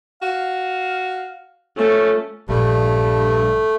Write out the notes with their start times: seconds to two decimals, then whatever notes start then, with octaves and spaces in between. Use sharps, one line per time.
0.22 F#4 F5
1.77 F3 A3 C#4
2.49 A#1 G2 A3